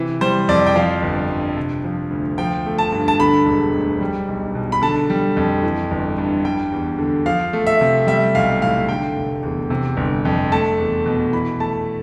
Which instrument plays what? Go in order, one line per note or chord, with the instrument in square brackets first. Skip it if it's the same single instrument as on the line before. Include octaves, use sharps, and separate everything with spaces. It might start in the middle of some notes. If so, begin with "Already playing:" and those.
Already playing: [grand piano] C3 E3
G3 C5
F2 D5
G5
F3 F5
G1
G2
C3
F3
D2
F3 G5
A3
A5
G2
A5
D3 B5
E1
D2
G3
B1
B2
B5
D3 A5
G3
F2
E3
G1
G2
G3 G5
E2
D3
F3 F5
A3
E5
C3
G3 E5
B1 F5
A2 F5
D3 G5
F1
E2
C3
G1
F2
A3 A5
E2
B2
E3 B5
A3 A5